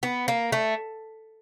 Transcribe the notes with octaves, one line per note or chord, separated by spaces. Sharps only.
B3
A#3
A3